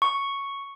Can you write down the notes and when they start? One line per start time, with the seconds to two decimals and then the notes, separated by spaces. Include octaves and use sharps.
0.02 C#6